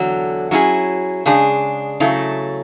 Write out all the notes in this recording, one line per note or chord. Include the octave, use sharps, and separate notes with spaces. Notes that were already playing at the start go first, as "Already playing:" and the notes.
Already playing: E2 D3 F#3
F#3 C#4 E4 G#4
C#3 G#3 D4 G#4
C#3 F#3 A3 E4